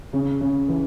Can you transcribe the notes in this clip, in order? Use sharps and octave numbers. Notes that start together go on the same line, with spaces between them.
C#3
C#3
E3